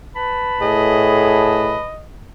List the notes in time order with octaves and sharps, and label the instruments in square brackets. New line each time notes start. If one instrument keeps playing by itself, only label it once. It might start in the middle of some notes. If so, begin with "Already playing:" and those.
[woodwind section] B4 A5 B5
[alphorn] A2 [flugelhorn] G#4 [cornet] D#5